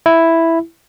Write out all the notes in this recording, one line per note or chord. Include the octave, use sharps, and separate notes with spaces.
E4